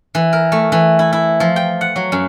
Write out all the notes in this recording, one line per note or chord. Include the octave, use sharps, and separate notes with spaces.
E3
A#4
A3
E3
E4
E4
F3
G5
F#5
F#3
F#2